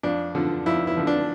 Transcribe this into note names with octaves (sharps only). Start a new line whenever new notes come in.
F2 D4
D3 F3
F2 E4
E4
D3 F3
D4